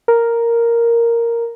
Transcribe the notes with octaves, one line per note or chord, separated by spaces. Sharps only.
A#4